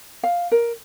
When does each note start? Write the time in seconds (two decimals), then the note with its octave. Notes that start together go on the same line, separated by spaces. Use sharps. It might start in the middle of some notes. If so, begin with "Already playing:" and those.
0.23 F5
0.52 A#4